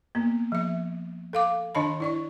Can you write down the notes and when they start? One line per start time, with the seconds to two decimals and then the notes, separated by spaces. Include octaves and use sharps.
0.15 A#3 B3
0.52 F3 E5
1.33 A4 F5 D6
1.75 D#3 D4 D#5 A5 B5
2.00 E4 D5 C#6